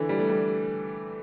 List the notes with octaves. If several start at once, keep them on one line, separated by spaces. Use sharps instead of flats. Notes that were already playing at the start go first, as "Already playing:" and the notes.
Already playing: D3 E3
G3
A3
G3